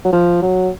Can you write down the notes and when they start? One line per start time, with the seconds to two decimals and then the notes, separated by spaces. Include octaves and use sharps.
0.05 F#3
0.12 F3
0.42 F#3